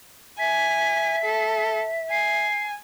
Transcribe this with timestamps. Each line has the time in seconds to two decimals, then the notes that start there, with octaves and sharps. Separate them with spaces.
0.39 E5 G#5 B6
1.24 A4
2.10 G#5 C7